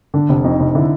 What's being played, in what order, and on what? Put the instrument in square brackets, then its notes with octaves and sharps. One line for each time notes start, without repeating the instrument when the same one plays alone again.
[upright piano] D3 [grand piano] D4
[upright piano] F1
[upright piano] F2 [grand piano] D#4
[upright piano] F1
[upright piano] D3 [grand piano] E4